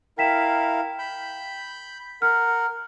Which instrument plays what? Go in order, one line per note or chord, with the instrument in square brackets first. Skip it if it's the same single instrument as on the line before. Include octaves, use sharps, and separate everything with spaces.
[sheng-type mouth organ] E4 A#4 F5 [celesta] G5 B6 E7
[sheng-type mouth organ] B5 G6
[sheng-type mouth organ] A#4 F#5 [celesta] F6